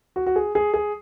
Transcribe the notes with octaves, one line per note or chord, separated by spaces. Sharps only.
F#4
F#4
G#4
G#4
G#4